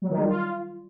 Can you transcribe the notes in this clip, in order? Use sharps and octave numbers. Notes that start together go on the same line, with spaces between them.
F#3
D#3
G3
F4